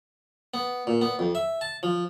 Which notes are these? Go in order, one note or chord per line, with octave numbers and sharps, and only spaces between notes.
B3
A#2
B3
F2
E5
A5
F3